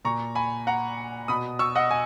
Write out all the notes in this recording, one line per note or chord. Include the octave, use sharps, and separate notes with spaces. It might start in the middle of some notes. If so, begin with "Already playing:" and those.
A#2 A#5 C#6
G#5 B5
F#5 A#5
B2 B5 D#6
C#6 E6
D#5 F#5
G#5